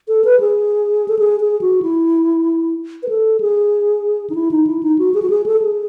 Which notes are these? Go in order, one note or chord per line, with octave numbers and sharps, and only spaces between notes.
A4
B4
G#4
A4
G#4
G#4
F#4
E4
B4
A4
G#4
D#4
E4
D#4
E4
D#4
F#4
G#4
F#4
G#4
A4
G#4